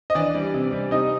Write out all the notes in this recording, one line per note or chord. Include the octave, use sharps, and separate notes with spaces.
D#5
E3 D4 D5
G3
C3
G3
C3 D#4 D#5